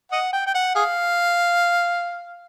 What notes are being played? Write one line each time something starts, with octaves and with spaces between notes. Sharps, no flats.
D#5 F#5
G5
G5
F#5
G#4 F5